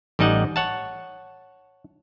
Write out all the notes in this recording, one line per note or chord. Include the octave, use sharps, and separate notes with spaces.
A1 G3 D#4 D#5 F#5
C#5 F#5 A5